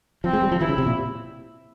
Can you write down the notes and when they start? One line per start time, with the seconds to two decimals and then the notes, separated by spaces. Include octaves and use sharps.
0.24 F3 C4
0.33 G#3
0.42 G3
0.52 F3
0.60 E3 E4
0.69 C#3
0.78 C3
0.87 A#2